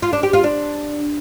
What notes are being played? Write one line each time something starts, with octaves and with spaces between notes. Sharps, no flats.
F4
D4
G4
F4
D4